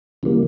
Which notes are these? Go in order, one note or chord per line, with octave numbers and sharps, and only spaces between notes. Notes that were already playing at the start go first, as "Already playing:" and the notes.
C#3 E3 G3 A#3